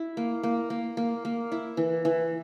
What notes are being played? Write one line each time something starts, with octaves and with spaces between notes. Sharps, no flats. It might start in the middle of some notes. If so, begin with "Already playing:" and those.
Already playing: E4
A#3
A#3
A#3
A#3
A#3
E4
E3
E3